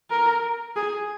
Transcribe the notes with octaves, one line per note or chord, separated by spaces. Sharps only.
A#4
G#4